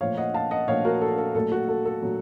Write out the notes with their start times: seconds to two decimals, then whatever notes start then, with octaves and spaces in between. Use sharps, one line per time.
0.01 A#2 F3 A3 C#5 F5
0.17 D#5 F#5
0.34 F5 A5
0.51 D#5 F#5
0.68 A#2 F3 A3 C#5 F5
0.85 F#4 A#4
1.02 A4
1.18 A4
1.35 A#2 F#3 A3 A4
1.52 F#4
1.68 A4
1.85 A4
2.02 A#2 F#3 A3